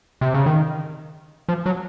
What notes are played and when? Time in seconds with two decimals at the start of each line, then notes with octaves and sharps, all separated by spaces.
0.21 C3
0.34 C#3
0.46 D#3
1.49 F3
1.66 F#3